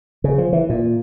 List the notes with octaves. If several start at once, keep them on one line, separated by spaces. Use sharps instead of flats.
C#3
F3
E3
A#2